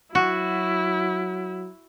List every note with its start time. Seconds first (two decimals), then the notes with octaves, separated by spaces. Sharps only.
0.15 F#3 E4 F#4